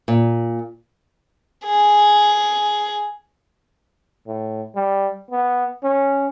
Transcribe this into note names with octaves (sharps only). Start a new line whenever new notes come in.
A#2
G#4
A2
G3
B3
C#4